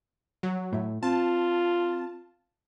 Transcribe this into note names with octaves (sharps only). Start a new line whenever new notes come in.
F#3
A2 E5
C4 F4 A5